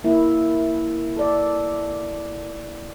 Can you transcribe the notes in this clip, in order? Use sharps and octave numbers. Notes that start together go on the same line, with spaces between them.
A#3 E4
A4 D5